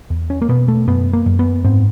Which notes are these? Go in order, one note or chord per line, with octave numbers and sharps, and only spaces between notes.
E2
C#4
A#3
B2 B3
A3
F#2 B3
A#3
F#2
B3
G#2 C4